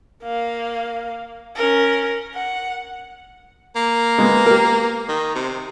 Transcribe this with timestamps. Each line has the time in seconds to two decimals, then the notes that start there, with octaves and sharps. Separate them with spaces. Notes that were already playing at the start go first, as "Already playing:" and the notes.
0.23 A#3 F5
1.56 C#4 A#4
2.35 F#5
3.76 A#3
4.18 G#3 B3
4.46 G4 A#4
5.08 D#3
5.35 C3